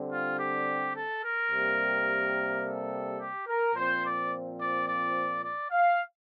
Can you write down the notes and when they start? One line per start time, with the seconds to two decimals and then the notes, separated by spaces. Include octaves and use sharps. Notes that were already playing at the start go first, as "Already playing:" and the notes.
Already playing: D3 G3 C4
0.11 F4
0.39 G4
0.95 A4
1.24 A#4
1.51 C3 G3 A#3
2.63 A4
3.20 G4
3.48 A#4
3.75 A#2 F3 C4 C5
4.04 D5
4.60 D5
4.88 D5
5.43 D5
5.71 F5